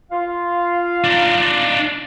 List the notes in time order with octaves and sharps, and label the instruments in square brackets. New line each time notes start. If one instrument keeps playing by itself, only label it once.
[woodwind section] F4 F5
[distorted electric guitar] D4 D#4